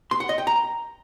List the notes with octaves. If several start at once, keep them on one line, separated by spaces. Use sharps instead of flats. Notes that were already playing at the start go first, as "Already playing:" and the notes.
C6
F#5
D#5
G5
A#5